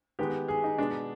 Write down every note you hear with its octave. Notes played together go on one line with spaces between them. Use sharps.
D#3 G#3 B3 G4
G#4
D#4
B2 G#3 B3 D4